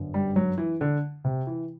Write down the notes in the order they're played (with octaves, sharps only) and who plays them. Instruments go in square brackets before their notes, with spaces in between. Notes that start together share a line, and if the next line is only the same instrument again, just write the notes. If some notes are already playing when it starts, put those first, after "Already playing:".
Already playing: [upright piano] G1 F#2 D3
[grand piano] G3
F#3
E3
D3
C3
E3